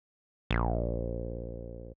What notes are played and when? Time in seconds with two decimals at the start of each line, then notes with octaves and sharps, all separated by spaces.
0.51 A#1